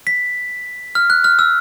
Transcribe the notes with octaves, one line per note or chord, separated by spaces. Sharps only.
B6
F6
F#6
F6
E6